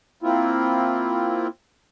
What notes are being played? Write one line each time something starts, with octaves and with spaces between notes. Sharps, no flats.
A#3 C4 E4 F4